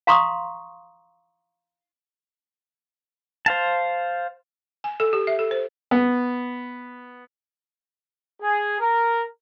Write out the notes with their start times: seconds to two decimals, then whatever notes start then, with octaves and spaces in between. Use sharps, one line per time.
0.07 F5 A#5 C6 C#6 D#6
3.46 C5 F5 A5
4.84 G#5
5.00 A4
5.13 G4
5.27 E5
5.39 A4
5.51 C5
5.91 B3
8.41 G#4
8.79 A#4